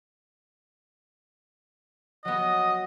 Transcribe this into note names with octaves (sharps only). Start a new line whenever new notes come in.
F#3 B3 D#5